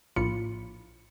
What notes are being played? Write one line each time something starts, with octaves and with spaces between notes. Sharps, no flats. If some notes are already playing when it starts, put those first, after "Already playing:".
A#1 A2 A#3 F4 B5 C#7